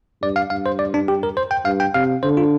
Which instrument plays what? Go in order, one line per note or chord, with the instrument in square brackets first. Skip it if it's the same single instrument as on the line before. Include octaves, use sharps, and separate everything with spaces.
[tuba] G2 [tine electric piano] D5
[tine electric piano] F5
[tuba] G2 [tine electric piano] F5
[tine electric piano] C5
D5
D4
G4
A#4
C5
G5
[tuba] G2 [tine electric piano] F5
[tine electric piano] G5
[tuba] C3 [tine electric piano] F5
[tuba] D3 [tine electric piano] C5
[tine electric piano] F4